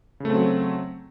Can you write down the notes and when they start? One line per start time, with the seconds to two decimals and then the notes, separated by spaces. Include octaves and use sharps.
0.20 C#3
0.25 A3
0.30 C4
0.34 F#3